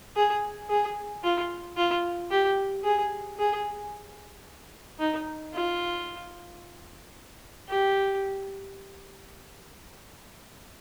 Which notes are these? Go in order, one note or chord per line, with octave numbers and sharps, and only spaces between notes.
G#4
G#4
F4
F4
G4
G#4
G#4
D#4
F4
G4